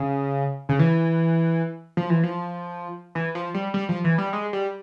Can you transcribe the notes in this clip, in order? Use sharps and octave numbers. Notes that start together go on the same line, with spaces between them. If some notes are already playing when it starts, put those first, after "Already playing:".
Already playing: C#3
C#3
E3
F3
E3
F3
E3
F3
G3
G3
F3
E3
G3
G#3
G3